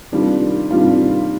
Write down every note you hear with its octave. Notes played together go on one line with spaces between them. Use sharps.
C3 D#3 G3 D4 F4
C3 D#3 G3 D4 F4